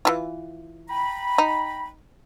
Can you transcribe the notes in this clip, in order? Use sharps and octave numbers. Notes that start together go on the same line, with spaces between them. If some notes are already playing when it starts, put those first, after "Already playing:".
E3 E4 F4
G5 A#5 B5
D#4